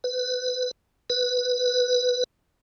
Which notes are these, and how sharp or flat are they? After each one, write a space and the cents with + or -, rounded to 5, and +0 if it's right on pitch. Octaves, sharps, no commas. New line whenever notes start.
B4 +25
B4 +5